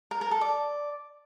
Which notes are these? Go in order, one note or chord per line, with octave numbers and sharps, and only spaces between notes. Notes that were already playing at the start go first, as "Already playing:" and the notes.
A#4
A#4
A4
D5